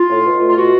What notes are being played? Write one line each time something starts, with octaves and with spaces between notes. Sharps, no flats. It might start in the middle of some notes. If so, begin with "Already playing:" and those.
Already playing: F4
A2
B2
A3
F4
B2 F#4